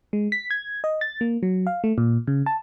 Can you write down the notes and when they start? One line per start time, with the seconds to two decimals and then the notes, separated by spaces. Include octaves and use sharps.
0.13 G#3
0.32 B6
0.51 G#6
0.84 D#5
1.01 A6
1.21 A#3
1.43 F#3
1.67 F5
1.84 A3
1.98 A#2
2.27 C#3
2.46 A5